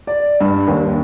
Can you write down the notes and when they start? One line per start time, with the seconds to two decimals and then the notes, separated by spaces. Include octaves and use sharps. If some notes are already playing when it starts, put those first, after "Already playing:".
0.07 D5
0.41 G2
0.68 D#2